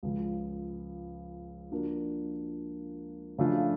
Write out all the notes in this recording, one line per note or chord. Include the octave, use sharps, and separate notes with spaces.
C#2 C#3 F3
F3 A#3 D4 F#4 A#4
C#3 F3 A3 D4 F4